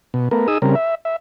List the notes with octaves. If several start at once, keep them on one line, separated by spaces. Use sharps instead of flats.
B2
A3 B3 A#4
D#4 G#4 D#6 E6
C#3 G3 C4 A#4
E5
E5